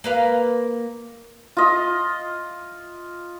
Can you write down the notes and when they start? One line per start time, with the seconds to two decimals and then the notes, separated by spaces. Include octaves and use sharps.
0.04 A#3 B4 F5
1.57 F4 D#5